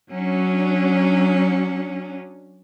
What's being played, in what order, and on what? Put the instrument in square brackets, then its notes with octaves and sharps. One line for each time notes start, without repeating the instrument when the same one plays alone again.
[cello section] F#3 C#4 D4